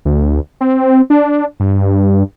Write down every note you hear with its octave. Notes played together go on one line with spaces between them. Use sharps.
D2
C4
D4
G2